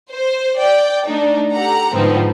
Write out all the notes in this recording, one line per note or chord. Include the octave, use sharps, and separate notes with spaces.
C5
D5 G5
A3 D4 D#4
G4 A4 F#5 A#5
G#2 D3 F3 B3 C4 D#4